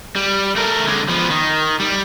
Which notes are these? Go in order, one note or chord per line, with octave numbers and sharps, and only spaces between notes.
G3
A3 A#4
D3 G#3
F3 B3
D#3
G3